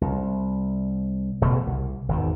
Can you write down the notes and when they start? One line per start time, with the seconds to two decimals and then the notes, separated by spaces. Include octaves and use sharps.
0.01 C2
1.41 E1 B2 A3
1.67 C2
2.09 G#1 E2 D#3